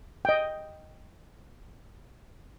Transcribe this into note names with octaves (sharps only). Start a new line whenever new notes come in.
D#5 G5